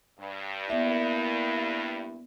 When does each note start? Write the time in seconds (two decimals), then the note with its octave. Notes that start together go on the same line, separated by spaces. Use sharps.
0.20 G2
0.70 A#3 B3 E4 D5 E5